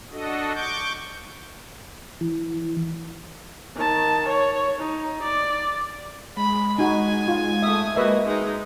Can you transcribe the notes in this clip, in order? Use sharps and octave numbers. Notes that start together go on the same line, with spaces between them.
D4 F#4 A4 D#5
C#6 D6 G6
E3
D#3 A5
C#5
D#4
D5
G#3 B5
D#4 F#4 G#5
F4
A3 E5 D#6
A#3 F#4 B4 D#5 E5
G#3 D#4